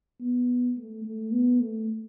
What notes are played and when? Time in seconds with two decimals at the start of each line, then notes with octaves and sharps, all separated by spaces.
0.21 B3
0.77 A3
1.05 A3
1.33 B3
1.60 A3